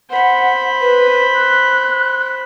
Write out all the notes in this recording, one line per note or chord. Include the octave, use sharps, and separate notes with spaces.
C5 F#5 B5
B4
F#6